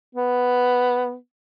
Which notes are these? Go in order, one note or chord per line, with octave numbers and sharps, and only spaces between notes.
B3